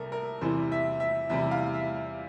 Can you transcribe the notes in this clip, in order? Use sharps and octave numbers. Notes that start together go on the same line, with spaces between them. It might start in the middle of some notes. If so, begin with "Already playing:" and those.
Already playing: C2 C3 G3 A4 A#4
A#4
E2 C3 E3 G3 C5
E5
E5
E2 C3 E3 G3 E5
F5
E5